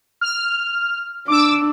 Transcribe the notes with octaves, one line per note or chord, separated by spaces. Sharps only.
F6
D4 D6 E6